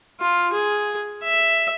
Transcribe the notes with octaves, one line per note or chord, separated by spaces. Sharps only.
F4
G#4
E5